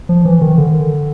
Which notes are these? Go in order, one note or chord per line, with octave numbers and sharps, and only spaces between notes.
F3
E3
D#3
D3